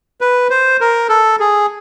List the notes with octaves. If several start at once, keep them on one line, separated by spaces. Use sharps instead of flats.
B4
C5
A#4
A4
G#4